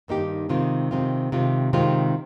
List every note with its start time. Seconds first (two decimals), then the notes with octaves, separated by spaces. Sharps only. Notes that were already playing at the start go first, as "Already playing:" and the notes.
0.08 G2 D#3 A#3 D#4 G4
0.49 C3 D#3 G#3 C4 F4
0.91 C3 D#3 G#3 C4 F4
1.32 C3 D#3 G#3 C4 F4
1.73 C3 D#3 G#3 C4 F4